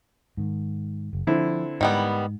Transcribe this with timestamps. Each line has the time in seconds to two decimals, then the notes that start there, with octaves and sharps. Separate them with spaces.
0.37 G#2 D#3
1.13 F#1
1.27 D3 F3 C4 E4
1.81 G#2 D#3 G3 B3